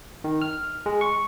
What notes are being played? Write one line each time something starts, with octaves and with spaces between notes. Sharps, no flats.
D#3
F6
G#3
C#6